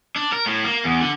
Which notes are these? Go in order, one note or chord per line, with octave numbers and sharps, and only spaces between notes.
D4
A#4
A2
A#3
E2
D3